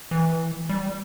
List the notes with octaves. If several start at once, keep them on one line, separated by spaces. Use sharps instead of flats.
E3
G3